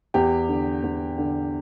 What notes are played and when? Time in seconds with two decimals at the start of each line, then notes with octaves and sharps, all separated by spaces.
0.14 E2 G4
0.48 D3
0.83 E2
1.18 D3